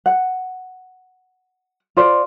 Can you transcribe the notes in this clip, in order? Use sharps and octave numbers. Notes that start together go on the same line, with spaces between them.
F#5
F4 C5 D5